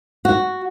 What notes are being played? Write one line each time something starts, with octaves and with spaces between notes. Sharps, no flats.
F#4